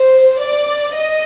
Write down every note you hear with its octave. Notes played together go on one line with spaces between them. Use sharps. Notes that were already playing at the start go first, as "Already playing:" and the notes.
Already playing: C5
D5
D#5